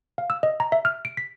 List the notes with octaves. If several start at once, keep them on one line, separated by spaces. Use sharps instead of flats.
F5
E6
D#5
A#5
E5
F6
D7
B6